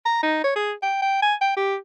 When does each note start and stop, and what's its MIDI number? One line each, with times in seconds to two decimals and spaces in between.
0.06 0.22 82
0.23 0.40 63
0.44 0.51 73
0.56 0.73 68
0.83 1.01 79
1.02 1.20 79
1.22 1.35 80
1.41 1.55 79
1.57 1.76 67